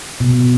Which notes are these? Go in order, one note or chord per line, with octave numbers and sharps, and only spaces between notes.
B2